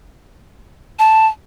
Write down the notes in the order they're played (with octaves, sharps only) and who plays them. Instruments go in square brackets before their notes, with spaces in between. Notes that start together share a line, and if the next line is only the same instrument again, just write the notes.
[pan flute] A5